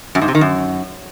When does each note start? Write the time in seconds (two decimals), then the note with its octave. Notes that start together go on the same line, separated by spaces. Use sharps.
0.15 F#2
0.22 G#2
0.28 C3
0.35 D#3
0.41 F#2